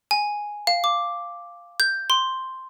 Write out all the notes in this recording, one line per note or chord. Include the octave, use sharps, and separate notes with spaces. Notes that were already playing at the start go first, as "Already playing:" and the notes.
G#5
F5
D6
G6
C6